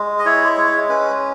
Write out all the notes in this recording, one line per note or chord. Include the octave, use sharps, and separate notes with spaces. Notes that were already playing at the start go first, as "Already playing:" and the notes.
Already playing: G#3
D#5
E4 C#5
G#3 C#5
C#4 B4